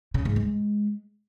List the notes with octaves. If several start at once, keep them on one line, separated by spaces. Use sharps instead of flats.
C#3
G#2
G#3